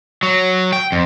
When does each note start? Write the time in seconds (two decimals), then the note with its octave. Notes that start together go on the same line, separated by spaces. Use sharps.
0.23 F#3
0.73 G5
0.92 F2